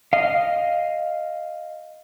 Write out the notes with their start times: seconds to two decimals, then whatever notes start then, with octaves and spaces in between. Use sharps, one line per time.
0.13 D#5 F5